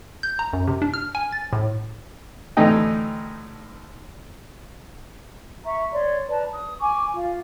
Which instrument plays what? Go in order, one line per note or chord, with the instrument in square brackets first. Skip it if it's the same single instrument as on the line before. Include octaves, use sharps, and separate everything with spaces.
[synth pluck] G6
A#5
F#2
C3
D4
F6
G#5
A6
A2
[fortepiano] D2 A2 E3 D#4 D#5 G5
[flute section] E5 A#5 C#6
C#5 D5 C6
B4 D5 A5 A#5
D#6
G#5 C#6 D6
F4 F5